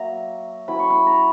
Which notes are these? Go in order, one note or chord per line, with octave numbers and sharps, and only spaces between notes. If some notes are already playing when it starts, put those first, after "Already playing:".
Already playing: F#3 A#3 E5 A#5
F#3 C#4 E4 B5
C#6
B5
A#5